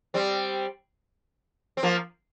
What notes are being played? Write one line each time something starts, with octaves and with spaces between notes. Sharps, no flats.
G3 C4
C4
F3 A#3